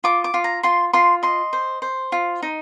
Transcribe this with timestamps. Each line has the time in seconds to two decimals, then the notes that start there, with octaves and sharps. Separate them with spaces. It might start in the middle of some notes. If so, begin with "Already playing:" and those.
0.04 F4 D6
0.24 D6
0.34 F4
0.44 A#5
0.63 F4 C6
0.93 F4 C6
1.23 D#5 C6
1.53 C5
1.82 C5
2.12 F4
2.42 D#4